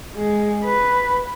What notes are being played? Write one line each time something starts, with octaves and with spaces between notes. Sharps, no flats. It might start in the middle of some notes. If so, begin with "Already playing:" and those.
G#3
B4